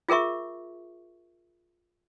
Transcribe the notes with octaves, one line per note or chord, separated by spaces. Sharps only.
F4 G#4 A#4 E5 C#6